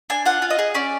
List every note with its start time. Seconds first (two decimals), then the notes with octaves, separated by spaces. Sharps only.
0.10 D4 G#5
0.25 F4 F#5
0.42 F4
0.50 D#5
0.59 G#4
0.75 C#4 D5